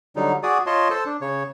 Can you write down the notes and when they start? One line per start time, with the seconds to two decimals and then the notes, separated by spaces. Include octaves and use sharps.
0.16 D3 F#3 G3 D#4
0.43 F#4 G#4 D5 D#6
0.67 F4 C#5 D#5 A5 C6
0.90 A4 C5 A5
1.06 D4
1.21 C#3 C#5